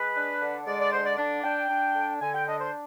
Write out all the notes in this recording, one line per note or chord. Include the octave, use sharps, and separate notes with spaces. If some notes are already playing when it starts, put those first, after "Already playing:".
Already playing: G#3 B4
D4
D3
G#3 D5
D5
D3 C5
D5
D4
D4 G5
D4
D3
D3 G#5
G5
D4 D#5
C5